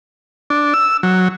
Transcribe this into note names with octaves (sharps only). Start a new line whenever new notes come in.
D4
E6
F#3